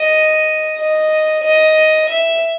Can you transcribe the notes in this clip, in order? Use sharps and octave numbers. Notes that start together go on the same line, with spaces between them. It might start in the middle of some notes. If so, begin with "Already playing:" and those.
Already playing: D#5
D#5
D#5
E5